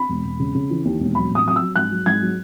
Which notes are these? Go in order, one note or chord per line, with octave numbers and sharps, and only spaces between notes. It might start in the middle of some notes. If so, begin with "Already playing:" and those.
Already playing: B5
E1
E1
C#3
C#3
E3
D#2
E1
F#3 B5
A1 D#6
F#3 D#6
F#3 E6
G#2 F#6
F#3
G#2 G#6
F#3